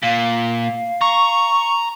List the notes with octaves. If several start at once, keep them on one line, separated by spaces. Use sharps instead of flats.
A#2 F5
A#5 C#6